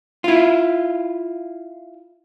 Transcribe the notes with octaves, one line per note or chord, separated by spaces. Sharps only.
E4 F4